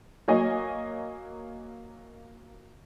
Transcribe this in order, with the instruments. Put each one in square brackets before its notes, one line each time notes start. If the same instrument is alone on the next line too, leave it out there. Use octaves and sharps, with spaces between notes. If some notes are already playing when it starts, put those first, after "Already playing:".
[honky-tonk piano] F#3 A#3 C#5 D#5 G#5